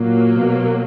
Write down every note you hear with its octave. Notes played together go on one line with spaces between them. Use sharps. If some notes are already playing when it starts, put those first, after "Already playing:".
Already playing: A#2 F#3 A#3
B2